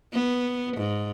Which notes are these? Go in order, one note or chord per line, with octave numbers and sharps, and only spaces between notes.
B3
G#2